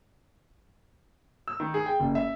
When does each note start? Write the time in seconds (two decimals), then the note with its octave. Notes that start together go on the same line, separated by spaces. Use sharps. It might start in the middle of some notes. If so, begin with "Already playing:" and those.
1.48 E6
1.60 D#3
1.74 G#4
1.86 G5
2.00 F#1
2.15 E5